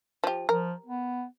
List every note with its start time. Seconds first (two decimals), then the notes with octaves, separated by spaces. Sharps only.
0.24 F3 G4
0.49 F3 A#4
0.86 B3